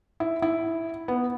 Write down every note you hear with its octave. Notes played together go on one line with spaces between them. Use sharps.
E4
E4
B3